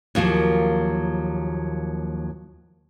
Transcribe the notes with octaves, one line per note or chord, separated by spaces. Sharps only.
D#2 F3 F#3 A#3